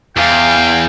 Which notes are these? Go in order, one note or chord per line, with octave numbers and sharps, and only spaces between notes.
E2 F5 G5